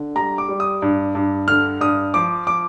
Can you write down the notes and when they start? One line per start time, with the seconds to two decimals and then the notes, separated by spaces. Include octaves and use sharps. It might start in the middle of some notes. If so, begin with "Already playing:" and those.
Already playing: D3
0.15 G3 A#5
0.38 D6
0.49 G3
0.60 D#6
0.82 G2
1.15 G2
1.47 D3 F6
1.81 G2 D#6
2.14 F3 D6
2.47 F3 D6